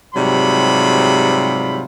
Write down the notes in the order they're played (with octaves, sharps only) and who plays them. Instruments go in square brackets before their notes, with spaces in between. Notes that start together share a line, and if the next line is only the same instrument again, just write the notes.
[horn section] G#2 C3 F#3 G3 F4 B5